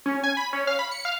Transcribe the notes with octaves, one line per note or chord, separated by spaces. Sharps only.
C#4
G#5
B5
C#4
F5
B5
C#7
F5